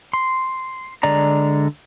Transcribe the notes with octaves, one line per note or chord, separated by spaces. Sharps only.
C6
D3 G#3 D5 A#5